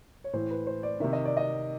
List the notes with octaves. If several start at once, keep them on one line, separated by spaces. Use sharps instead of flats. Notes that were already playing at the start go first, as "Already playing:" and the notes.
C#5
A2 E3 C5
B4
C5
D5
C3 D#3 E5
D#5
D5
D#5